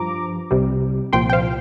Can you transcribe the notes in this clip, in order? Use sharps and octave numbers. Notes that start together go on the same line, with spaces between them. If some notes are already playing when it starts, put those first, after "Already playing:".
Already playing: G2 F3 A#5 D6
C2 C3 G3
C2 A#2 F3 G5 C6
G5
C5 F5